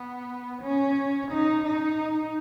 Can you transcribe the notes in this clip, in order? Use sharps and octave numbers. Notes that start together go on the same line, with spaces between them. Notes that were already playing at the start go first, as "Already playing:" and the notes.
Already playing: B3
C#4
D#4
D#4